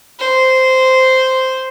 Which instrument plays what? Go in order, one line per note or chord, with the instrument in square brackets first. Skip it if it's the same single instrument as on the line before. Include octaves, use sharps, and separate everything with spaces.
[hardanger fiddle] C5